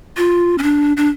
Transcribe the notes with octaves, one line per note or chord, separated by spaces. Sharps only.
F4
C#4
D4
D4